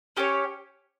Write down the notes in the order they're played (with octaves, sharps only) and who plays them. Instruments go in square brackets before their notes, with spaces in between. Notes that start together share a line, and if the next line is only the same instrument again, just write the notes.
[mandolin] C#4 G4 C#5